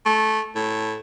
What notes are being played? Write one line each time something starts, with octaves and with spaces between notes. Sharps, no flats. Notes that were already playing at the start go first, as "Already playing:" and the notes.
A3
A2